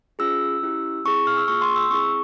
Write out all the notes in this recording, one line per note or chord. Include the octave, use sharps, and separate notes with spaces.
C#4 F4 G#4 E6
C#4 E4 G4
C4 E4 G#4 C#6
F6
E6
A#3 F4 G#4 C#6
C6
E6
C4 E4 G#4 C#6